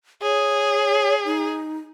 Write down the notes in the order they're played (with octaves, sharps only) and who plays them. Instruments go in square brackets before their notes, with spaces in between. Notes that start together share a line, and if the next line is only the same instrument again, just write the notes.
[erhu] G#4 [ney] C#5
[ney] D#4